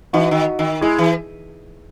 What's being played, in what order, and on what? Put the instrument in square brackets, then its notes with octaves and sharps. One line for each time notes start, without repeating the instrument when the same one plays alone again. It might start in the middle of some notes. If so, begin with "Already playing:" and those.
[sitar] E3 [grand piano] D#4 F#4
[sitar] D#3
D#3
[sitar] G#3 [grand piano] E4 G#4
[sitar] E3